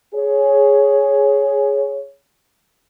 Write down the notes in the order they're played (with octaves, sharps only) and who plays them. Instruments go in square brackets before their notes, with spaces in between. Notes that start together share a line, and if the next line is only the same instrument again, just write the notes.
[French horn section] G#4 C#5